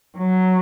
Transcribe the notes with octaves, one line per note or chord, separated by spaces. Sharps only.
F#3